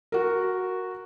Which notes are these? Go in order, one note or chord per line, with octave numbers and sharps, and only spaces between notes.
F#4 A#4